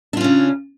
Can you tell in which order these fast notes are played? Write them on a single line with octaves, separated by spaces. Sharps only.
D4 F4 C#4 C#3